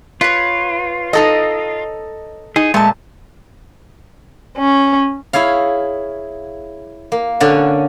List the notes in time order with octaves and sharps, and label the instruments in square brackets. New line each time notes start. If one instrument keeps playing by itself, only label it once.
[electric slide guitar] F4 [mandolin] B4 C#5
[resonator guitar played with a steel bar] D#4 A4 D#5
[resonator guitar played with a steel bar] D#4 [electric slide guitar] G#4
[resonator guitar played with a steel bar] A#2 [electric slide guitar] G#3 [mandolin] A3 A5
[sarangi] C#4
[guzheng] E4 G#4 C#5 F5
A#3
D3 C#4 D5 F#5 G#5